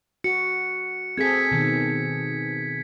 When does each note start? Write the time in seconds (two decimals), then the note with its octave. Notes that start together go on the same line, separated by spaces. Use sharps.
0.24 F#4 C#7
1.18 C4 G#4 A4 G#6 B6
1.51 B2 D#3